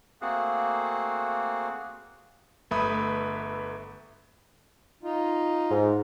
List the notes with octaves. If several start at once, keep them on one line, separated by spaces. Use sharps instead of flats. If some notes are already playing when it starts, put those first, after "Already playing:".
A3 A#3 C4 F#4 G#4
G1 A3 B4 E5 B5 D#6
D#4 F4
G#2